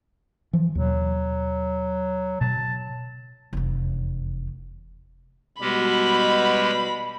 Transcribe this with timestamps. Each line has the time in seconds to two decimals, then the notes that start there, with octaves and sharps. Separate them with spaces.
0.53 E3 F3
0.75 D#2 B2 F#3
2.41 B2 A5
3.53 F1 E2
5.61 B2 G3 G#3 G4 B5